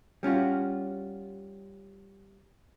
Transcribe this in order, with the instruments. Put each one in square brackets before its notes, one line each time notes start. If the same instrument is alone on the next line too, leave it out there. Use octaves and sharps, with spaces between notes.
[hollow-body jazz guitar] G3 C#4 F4 F#4